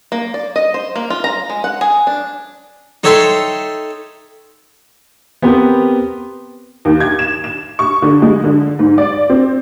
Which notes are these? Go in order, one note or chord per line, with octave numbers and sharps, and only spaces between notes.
A#3
D5
D#5
C5
A#3
F4
A#5
G#3
F#5
G#4
D4
D#4 A4 C#5 E5 G5 C6
B3 C4 G4 A#4 B4
D#2
G#6
E7
E7
C#6
D3
G#3
D3
G#2
D5
C4